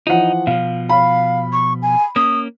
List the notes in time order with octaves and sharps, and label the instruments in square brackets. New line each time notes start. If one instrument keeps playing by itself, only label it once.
[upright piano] E3 F3 F#5 [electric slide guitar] D#4
[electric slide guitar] B2 F3 [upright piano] F5
[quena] F5 [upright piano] B5
[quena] C#6
G#5
[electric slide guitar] A#3 C#4 [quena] D#6